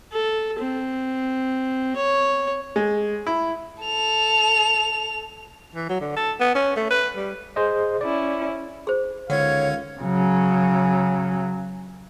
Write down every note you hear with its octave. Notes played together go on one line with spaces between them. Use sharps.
A4
C4
C#5
G#3
E4
A4 F7
E3
F#3
D3
A4
B3
C#4
A3
B4
G3
G#4 C5 D#5
C#4 E4 D5
G#4 C5
C#2 D3 D#3 C#5 F5 F#5 G#6
C#3 F#3